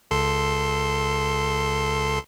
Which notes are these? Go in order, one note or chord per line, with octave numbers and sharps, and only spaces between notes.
C#2 A4 C6